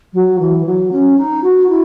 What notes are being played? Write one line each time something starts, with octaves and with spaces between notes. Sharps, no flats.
F#3
E3
F#3
C#4
D#4
F#4
E4